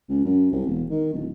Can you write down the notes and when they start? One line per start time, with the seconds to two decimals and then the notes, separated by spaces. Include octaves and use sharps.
0.09 C#2
0.25 F#2
0.51 C2
0.66 E1
0.90 D#3
1.13 D1